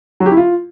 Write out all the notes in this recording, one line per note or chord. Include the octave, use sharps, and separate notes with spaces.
F#3
G4
E4
F4